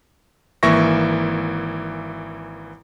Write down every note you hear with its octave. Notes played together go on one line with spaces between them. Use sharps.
G#1 E3 A#3 E5 C#6 A#6